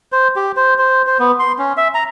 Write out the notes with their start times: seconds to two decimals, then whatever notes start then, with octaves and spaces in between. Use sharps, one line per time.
0.12 C5
0.36 G4
0.57 C5
0.78 C5
1.07 C5
1.19 B3
1.39 C6
1.59 C#4
1.77 E5
1.94 A#5